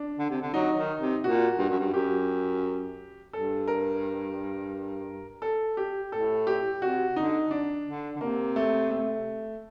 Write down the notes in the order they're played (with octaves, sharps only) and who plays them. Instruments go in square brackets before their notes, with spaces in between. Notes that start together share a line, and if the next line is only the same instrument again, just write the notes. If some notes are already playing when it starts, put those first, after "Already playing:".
Already playing: [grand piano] D4
[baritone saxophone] D3
C3
D3
[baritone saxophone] F#3 [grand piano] D#4
[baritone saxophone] D#3
C3
[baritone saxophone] A#2 [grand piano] F#4
[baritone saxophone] G2
F#2
G2
[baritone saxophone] F#2 [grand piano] G4
[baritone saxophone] G2 [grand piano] A4
[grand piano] A#4
A4
G4
[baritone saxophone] A2 [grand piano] A4
[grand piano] G4
[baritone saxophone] C3 [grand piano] F#4
[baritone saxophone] D3 [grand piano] D#4
[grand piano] D4
[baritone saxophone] D3
D3
[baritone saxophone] C3 [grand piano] A#3
[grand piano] A3
A3